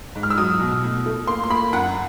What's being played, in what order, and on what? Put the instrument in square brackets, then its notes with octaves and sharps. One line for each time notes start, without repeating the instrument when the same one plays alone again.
[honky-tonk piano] G#2
F6
E6
F#3 D#6
B2
A2
A3
A#3 C6
C6
A#3 B5
F#2 F#5